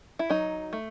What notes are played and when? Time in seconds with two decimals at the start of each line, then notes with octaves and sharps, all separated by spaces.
0.19 E4
0.30 F#3 D#4
0.73 A3